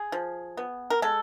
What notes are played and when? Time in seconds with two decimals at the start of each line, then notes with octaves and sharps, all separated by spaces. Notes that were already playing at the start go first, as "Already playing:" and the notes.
Already playing: G#4
0.12 F3
0.57 B3
0.90 A#4
1.02 G#3 A4